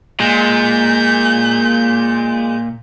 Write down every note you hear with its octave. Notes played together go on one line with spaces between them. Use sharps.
A#2 G#3 G6